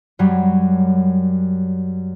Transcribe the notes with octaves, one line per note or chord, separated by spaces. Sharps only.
F#2 F#3 G3